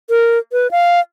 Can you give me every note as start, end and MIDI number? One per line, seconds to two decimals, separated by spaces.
0.10 0.38 70
0.52 0.71 71
0.71 1.00 77